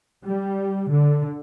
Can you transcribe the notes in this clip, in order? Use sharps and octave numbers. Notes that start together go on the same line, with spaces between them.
G3
D3